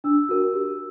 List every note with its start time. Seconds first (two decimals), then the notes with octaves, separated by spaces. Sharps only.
0.04 D4 E6
0.29 F#4 A#4
0.54 G4